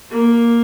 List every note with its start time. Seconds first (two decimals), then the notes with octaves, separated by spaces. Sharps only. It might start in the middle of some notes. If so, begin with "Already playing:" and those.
0.11 A#3